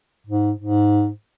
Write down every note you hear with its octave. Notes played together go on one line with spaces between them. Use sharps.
G#2
G#2